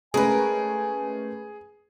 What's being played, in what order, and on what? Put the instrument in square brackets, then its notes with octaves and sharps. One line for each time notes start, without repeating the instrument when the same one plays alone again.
[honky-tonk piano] G#3 A3 C#4 [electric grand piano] G#4 [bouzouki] A#4 B4 [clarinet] G#5